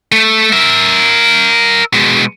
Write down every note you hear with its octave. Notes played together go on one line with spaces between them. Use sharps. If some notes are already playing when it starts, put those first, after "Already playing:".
A3
A#4 E5
B2 G#3